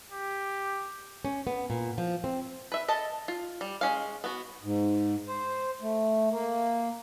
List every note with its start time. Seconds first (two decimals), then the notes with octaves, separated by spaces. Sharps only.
0.11 G4
1.25 C#4
1.47 B3
1.70 A#2
1.98 F3
2.24 C4
2.72 B4 E5
2.88 A4 D#5 A5
3.28 F4
3.61 G3
3.81 G#3 C#4 F5
4.24 B3 F#4
4.63 G#2
5.28 C5
5.82 A3
6.31 A#3